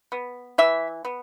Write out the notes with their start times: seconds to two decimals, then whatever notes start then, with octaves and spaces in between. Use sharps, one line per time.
0.12 B3
0.58 E3 E5
1.05 B3